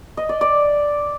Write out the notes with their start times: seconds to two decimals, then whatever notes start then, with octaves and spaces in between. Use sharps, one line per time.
0.17 D#5
0.29 D5
0.41 D5